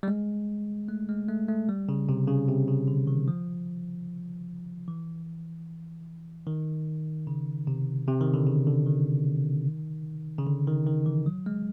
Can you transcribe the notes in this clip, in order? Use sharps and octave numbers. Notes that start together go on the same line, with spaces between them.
G3
G#3
A3
G#3
A3
A3
G3
C#3
C3
C#3
C3
C#3
D3
D#3
F3
E3
D#3
C#3
C3
C3
D#3
D3
C#3
D3
D#3
C#3
D3
D#3
D#3
E3
F#3
G#3